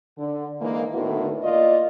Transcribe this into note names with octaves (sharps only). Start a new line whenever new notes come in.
D3
G#2 D3 E3 G#3 A#3
A2 D3 D#3 B3 E4 F#4
E2 A#3 F4 D5 D#5